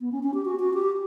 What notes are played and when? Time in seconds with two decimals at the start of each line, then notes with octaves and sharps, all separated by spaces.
0.01 B3
0.12 C#4
0.23 C#4
0.34 G4
0.45 F#4
0.60 F#4
0.74 G4